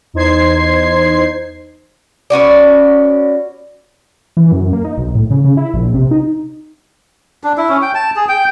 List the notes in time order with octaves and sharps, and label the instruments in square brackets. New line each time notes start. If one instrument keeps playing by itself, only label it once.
[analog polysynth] E2 D#4 C5 G#6 C7
[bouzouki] B3 C#4 F#4 D5
[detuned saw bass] E3
F#2
A#3
D#4
B1
A2
C#3
C#3
E4
A#1
C3
D#4
[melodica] D4
E4
C#4
G5
A5
G#4
G5